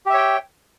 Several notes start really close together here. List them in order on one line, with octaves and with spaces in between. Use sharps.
G4 E5 C#5 G5